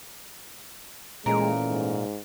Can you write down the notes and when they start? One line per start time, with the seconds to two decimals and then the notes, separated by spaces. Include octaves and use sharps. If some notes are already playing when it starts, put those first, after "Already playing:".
1.26 A#2 E3 G#3 A3 C#4 A#4
1.62 G#2